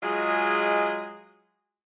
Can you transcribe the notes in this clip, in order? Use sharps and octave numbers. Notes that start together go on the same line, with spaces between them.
F#3 G#3 F4 G#4 D#5